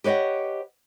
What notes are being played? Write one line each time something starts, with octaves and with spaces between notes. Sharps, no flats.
G4 B4 C#5 D#5 F#5